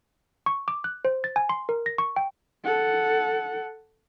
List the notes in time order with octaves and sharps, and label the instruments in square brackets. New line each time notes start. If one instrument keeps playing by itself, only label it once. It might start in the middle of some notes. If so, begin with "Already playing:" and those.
[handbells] C#6
D6
F#6
C5
A6
G#5
C6
A#4
A#6
C#6
G5
[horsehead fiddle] A4 F#5